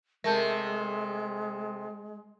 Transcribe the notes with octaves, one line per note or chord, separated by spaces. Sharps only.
C3 G#3 A3 A#4 A5 G6